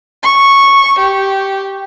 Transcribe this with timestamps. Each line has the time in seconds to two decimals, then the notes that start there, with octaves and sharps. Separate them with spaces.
0.23 C#6
0.98 G4